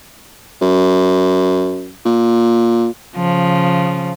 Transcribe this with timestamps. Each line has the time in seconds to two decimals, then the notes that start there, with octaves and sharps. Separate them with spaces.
0.62 F#2
2.06 A#2
3.16 C#3 F3